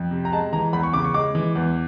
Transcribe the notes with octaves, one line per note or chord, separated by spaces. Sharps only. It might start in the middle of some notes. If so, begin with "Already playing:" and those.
Already playing: F2
C3
A#5
G#3 A5
E3 A#5
E2 B5
C#6
C#3 D6
C#6
G#3 D6
E3
E2